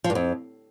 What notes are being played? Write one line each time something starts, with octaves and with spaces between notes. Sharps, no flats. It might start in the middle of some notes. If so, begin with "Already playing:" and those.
F3
G2
F2